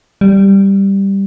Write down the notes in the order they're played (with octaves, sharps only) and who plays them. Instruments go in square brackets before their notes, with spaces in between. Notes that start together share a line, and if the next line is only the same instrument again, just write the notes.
[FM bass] G3